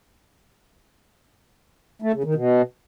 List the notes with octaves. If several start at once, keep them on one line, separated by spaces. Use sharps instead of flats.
A3
C#3
D#3
B2